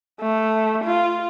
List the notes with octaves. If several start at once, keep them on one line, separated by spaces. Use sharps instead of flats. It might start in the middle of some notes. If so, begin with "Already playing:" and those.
A3
F4